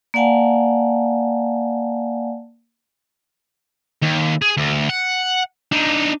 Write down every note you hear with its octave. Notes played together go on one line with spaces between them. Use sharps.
A#3 D5 F5 F#5 G#5 A5
D#2
G#4
D2
F#5
D4 D#4